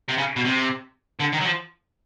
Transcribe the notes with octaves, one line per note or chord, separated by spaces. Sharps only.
C3
C#3
B2
C3
D3
D#3
F#3
F3